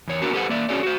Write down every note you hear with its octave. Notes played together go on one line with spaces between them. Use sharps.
E2 C#5
B3 D4 F#4 A#4
G4 A4 B4 C5 D#5 F#5
A#3 D5 E5
C#4 F#4 G#4 C#5 D5
F#4 C5